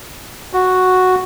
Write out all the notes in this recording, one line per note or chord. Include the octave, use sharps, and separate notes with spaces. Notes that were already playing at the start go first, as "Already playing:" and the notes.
F#4